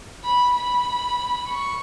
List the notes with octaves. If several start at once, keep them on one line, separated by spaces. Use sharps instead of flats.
B5
B5
C#6